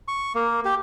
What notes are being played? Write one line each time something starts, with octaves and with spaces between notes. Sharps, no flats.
C#6
A#3
G4